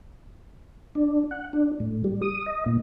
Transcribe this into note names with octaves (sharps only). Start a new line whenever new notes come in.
D4
F#5
D4
A2
G3
D#6
D#5
A#2